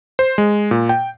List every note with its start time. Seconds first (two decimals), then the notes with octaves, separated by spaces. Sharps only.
0.19 C5
0.38 G#3
0.71 A#2
0.89 G5